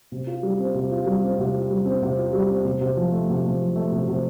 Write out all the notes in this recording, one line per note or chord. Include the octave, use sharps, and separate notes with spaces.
C3
F4
G3
C4
C3
F4
G3
C4
C3
F4
G3
C4
C3
F4
G3
C4
C3
C3
F3
A3
C3
C3
F3
A3
C3
C3